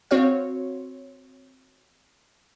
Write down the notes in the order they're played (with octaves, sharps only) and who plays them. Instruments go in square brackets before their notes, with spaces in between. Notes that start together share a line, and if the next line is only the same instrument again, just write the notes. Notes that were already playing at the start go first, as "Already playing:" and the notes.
[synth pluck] C4 F#4 C#5 F5